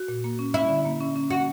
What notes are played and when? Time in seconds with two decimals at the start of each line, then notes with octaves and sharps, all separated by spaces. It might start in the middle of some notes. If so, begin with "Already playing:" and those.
Already playing: F#4
0.08 A#2
0.24 A#3
0.39 C#4
0.54 C#4 E4
0.69 D3
0.85 A#3
1.00 C#4
1.16 C#4
1.30 C#4 F#4